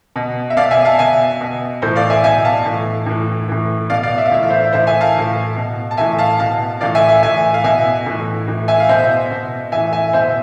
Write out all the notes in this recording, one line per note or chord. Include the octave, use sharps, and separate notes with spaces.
B2
E5
B2 D5 F5
E5 G#5
F5 A5
B2 E5 G#5
B2
A2 E3 A4 C5
D5 F5
E5 G#5
B2 E5 G#5
F5 A5
A2 E3
A2 E3
A2 E3
B2 D5 F5
D5 F5
E5
F5
A2 E3 E5
F5
C5 E5
A2 E3 C5 E5
E5 G#5
F5 A5
A2 E3
B2
A5
A2 E3 E5 G#5
F5 A5
B2 F5 A5
A2 E3 D5 F5
E5 G#5
E5 G#5
A2 E3 E5 G#5
F5
B2 E5 G#5
A2 E3
A2 E3
E5 G#5
F5
B2 C5 E5
B2
A2 E3 E5 G#5
E5 G#5
B2 C5 E5